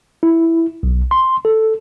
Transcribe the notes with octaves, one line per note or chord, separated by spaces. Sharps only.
E4
B1
C6
A4